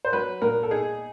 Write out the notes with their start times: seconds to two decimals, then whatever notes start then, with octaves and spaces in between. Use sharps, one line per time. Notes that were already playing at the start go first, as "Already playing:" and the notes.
0.05 C5
0.13 F#3 B4
0.42 A#2 A#4
0.63 A4
0.71 D#4 G#4